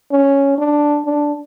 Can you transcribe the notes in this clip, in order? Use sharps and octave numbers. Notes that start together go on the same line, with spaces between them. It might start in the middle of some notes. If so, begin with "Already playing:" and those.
C#4
D4
D4